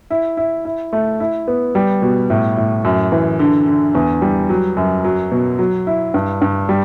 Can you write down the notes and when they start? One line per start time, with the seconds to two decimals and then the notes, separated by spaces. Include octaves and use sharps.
0.10 E4
0.37 E4
0.65 E4
0.93 A3
1.20 E4
1.48 B3
1.75 G3
2.02 B2
2.30 A2
2.57 A2
2.85 F#2
3.12 E3
3.39 D3
3.67 D3
3.95 E2
4.22 G3
4.49 F#3
4.77 F#2
5.04 F#3
5.32 B2
5.59 F#3
5.87 E4
6.14 G2
6.42 G2
6.69 G3